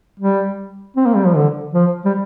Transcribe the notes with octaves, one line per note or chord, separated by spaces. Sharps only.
G3
C4
A#3
G3
F3
D3
F3
G3